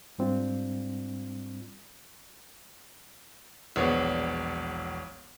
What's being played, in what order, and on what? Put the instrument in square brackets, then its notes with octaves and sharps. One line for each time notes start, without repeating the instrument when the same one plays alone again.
[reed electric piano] G#2 G3 C4 D4 F4
[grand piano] E1 A#1 B3 D4 C#5